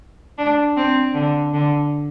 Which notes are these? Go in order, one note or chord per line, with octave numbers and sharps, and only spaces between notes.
D4
C4
D3
D3